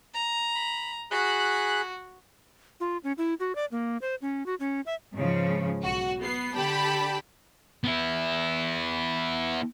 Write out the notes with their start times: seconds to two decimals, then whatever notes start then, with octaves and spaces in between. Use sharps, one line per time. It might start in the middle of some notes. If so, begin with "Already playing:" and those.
0.14 A#5
0.55 B5
1.11 F#4 G#4 B5 F#6
2.80 F4
3.04 C#4
3.18 E4
3.40 F#4
3.55 D5
3.71 A#3
4.02 C5
4.22 C#4
4.46 F#4
4.60 C#4
4.86 E5
5.15 G#2 C#3 F3
5.83 B1 F#4
6.20 B3 C7
6.56 D3 G4 G5 A5 B5
7.84 B3 E4